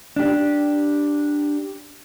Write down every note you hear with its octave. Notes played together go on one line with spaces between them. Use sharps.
D4 G4